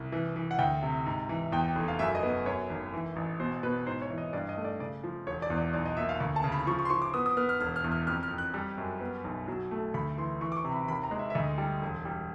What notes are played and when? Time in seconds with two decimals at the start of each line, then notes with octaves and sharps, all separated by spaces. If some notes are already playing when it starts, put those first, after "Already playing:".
Already playing: C2
0.12 E3
0.36 E3
0.51 F#5
0.59 D2 G5
0.83 C3
1.06 G#2
1.29 E3
1.52 E2 G5
1.64 G5
1.76 F1
1.88 F5
1.99 F#2 E5
2.15 D#5
2.23 B3
2.46 F#2 C#5
2.70 G#1
2.93 E3
3.16 A1
3.40 B2 C5
3.63 B2 B4
3.86 G#2 C5
4.02 C#5
4.10 E3
4.18 D#5
4.33 G2 D5
4.49 D#5
4.57 A3
4.65 D5
4.80 C#3 D5
5.04 F3
5.27 E1 C#5
5.42 D5
5.50 E2
5.58 D5
5.73 B1 D5
5.85 D#5
5.97 A#2 E5
6.09 F5
6.20 D2
6.36 A5
6.44 C#3
6.52 B5
6.67 F3 C#6
6.79 C#6
6.85 C6
6.90 F3 C#6
7.02 D6
7.14 B3 D#6
7.26 D#6
7.37 B3 F6
7.49 F6
7.60 E1 F6
7.76 F6
7.84 E2
7.92 F6
8.07 F2 F6
8.23 F6
8.31 F2
8.38 F#6
8.54 G3
8.78 F#2
9.01 B3
9.24 B1
9.48 F#3
9.71 A3
9.94 D2 B5
10.18 E3 C6
10.41 E3 C#6
10.52 D6
10.57 C#6
10.65 C3
10.72 B5
10.88 D#2 B5
11.03 A#5
11.11 G#3
11.19 E5
11.30 E5
11.35 D2 D#5
11.58 G3
11.82 E1
12.05 G3